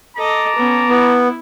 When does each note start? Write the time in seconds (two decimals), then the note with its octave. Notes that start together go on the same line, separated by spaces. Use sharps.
0.17 A4 D#5 A5 A#5 D6
0.56 B3 C#4
0.90 B3 E4